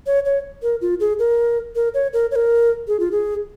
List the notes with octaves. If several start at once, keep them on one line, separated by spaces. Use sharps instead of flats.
C#5
C#5
A#4
F4
G#4
A#4
A#4
C#5
A#4
C#5
A#4
G#4
F4
G#4